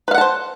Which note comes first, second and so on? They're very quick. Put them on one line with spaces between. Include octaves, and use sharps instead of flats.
B4 F5 F#5 A5 C5